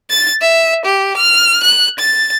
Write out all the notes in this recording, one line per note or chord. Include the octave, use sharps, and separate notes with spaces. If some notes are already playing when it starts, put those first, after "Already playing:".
A6
E5
G4
F6
F#6
A6